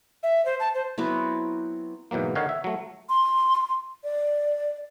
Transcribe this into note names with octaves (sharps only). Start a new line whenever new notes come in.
E5
C5
A5
C5
F#3 B3 C4 E4
G#2 B2 E3 F#3 A#3
D3 D#3 D#4 C#5 F5 F#5
E5
F#3 A3
C6
D5